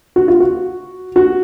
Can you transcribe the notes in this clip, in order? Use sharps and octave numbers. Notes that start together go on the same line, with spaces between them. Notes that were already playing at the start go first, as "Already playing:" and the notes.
F#4
F4
F#4
F#4